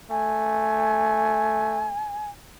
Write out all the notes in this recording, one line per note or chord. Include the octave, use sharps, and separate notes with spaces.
A3 G#5